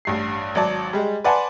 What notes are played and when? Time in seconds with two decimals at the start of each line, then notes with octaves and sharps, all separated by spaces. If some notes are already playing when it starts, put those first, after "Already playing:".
0.05 A1 G2 C7
0.55 G#1 F#3 D5 A5
0.93 G3 G#3
1.24 B4 D5 F#5 G#5 A5 C6